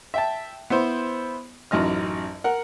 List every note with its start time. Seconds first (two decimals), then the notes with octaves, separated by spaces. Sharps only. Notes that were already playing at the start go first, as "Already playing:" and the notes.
0.14 E5 G5 A5
0.70 B3 E4 C5
1.71 A1 F#2 D#4 D#5 F6
2.44 A#4 F#5